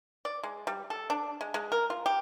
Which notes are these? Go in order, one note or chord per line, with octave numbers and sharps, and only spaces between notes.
D5
G#3
G3
A4
D4
G#3
G#3
A#4
F4
G4